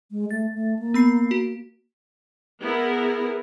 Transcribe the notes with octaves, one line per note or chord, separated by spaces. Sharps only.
G#3
A3 A6
A3
A#3
B3 B5 C7
F#4
B3 E4 G#4 A#4